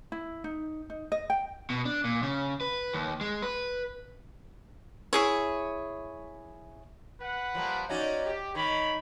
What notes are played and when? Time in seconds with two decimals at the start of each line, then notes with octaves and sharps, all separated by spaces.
0.12 E4
0.44 D#4
0.90 D#4
1.12 D#5
1.30 G5
1.70 B2
1.85 D4
2.04 A#2
2.23 C#3
2.61 B4
2.94 D#2
3.21 G#3
3.42 B4
5.13 E4 G#4 C#5
7.19 B4 F#5
7.55 F3 G3 A#3
7.89 C#4 D#4 F#4 D5
8.25 G4
8.55 D#3 C#5 B5